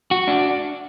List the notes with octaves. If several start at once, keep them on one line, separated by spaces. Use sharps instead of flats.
F#4
D4